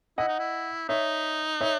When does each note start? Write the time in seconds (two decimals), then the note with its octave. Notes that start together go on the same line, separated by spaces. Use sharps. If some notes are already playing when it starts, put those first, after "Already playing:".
0.18 E4 D#5 F#5
0.28 D#4
0.39 E4
0.89 D#4 C#5 E5
1.61 C#5 E5